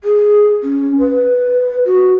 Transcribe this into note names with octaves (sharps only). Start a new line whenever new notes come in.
G#4
C#4
B4
F#4